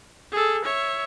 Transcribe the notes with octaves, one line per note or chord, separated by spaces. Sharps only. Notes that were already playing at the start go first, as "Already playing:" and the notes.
G#4 A4
C#5 E5